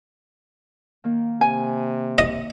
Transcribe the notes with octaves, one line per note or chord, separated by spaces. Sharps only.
D#3 A#3
C3 G#5
D#5